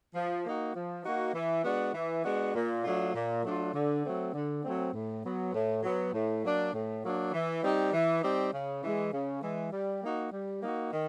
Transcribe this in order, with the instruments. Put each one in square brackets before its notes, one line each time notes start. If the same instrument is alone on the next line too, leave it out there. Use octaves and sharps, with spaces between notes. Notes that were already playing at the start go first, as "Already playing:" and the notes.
[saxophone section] F3
A#3 D#4 F#4
F3
A#3 D#4 F#4
E3
G#3 B3 D4 F#4
E3
G#3 B3 D4 F#4
A#2
F#3 A3 D4 F4
A#2
F#3 A3 D4 F4
D3
F#3 A3 C4
D3
F#3 A3 C4
A2
F#3 B3
A2
F#3 B3
A2
F#3 A#3 D4
A2
F#3 A#3 D4
E3
G3 C4 D#4 G4
E3
G3 C4 D#4 G4
C#3
E3 G#3
C#3
E3 G#3
G3
A#3 D#4 F#4
G3
A#3 D#4 F#4
D#3